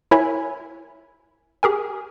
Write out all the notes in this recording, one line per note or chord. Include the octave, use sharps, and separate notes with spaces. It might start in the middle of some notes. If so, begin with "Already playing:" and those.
E4 A#4 C#5 E5 G#5 B5
G4 G#4 A#4 G#5